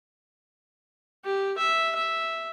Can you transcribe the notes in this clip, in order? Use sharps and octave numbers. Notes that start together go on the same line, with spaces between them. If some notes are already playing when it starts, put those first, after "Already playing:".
G4
E5
E5